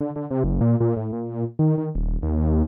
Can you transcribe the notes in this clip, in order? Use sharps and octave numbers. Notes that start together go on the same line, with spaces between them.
D3
D3
C3
F#1
A#2
A#2
A2
A#2
D#3
D#3
D#1
D#2